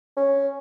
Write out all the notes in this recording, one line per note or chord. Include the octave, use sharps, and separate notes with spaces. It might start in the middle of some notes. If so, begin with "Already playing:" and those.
C#4